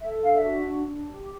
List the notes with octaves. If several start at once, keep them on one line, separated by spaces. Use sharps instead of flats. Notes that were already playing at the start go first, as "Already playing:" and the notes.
A4 E5
D4 F5
E5
F#4
D4
D4
G4